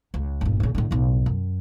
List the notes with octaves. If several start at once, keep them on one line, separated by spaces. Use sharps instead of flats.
C#2
G1 A#2
A#2 C#3
A2 D3
B1 A2
F#2